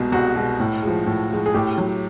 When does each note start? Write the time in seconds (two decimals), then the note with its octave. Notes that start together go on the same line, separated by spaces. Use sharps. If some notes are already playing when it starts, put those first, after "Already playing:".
Already playing: C2 B2 G#3 G#4
0.12 C2 F#4
0.36 B2 G#3
0.60 A2
0.83 F3 G#3
1.07 A2
1.30 F3 G#3
1.46 G#4
1.54 A2 G4
1.78 F#3